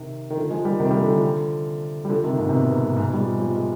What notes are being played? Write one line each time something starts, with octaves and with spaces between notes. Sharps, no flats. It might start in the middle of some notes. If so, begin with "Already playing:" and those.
Already playing: C3 D#3
D#3
D3 F3
F3 G#3
D#3 G3
C3 D#3
D#3 G3
D3 F3
D3 F3
G3
D3 F3
C3 D#3
G#2 C3
C3
B2
B2
G#2
G#2
B2
G3
F3 G#3
F3 G#3
G#3